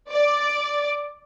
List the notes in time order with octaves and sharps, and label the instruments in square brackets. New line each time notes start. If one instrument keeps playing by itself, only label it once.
[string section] D5